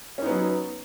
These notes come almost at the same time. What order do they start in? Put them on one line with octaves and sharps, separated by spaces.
C#4 D#4 B3 F#3